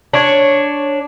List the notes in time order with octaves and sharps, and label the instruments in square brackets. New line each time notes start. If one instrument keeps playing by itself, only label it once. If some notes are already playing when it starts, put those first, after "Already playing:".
[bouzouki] D4 C#5